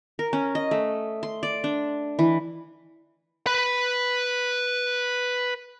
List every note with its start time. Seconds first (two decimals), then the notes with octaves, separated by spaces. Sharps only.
0.19 A#4
0.33 C#4
0.55 D#5
0.71 A3
1.23 C6
1.43 D5
1.64 D4
2.19 E3
3.46 B4 B5